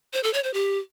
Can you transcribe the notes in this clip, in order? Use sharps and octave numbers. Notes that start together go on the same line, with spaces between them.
C5
A4
C#5
C5
G4